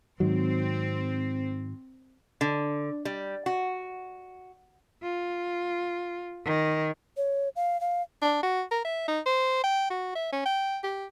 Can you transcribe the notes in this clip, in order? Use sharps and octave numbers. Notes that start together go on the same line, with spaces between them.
G#2 D#3 F#3 C4
D3
G3
F#4
F4
D#3
C#5
F5
F5
D4
F#4
A#4
E5
D#4
C5
G5
F#4
E5
C#4
G5
G4